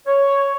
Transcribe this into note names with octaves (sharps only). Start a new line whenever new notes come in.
C#5